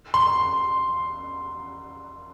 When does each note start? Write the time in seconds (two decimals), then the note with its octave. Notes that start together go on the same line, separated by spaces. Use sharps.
0.14 C6